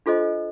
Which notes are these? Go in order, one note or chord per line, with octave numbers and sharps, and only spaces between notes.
D4 F4 A4 C5 D#5